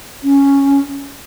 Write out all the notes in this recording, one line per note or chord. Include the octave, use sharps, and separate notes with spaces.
C#4